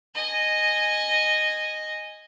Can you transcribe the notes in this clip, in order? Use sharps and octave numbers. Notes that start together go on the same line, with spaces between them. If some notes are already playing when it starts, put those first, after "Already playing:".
D#5 G#5